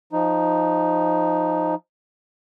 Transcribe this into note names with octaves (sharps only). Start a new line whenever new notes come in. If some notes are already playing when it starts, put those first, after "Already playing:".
F3 D#4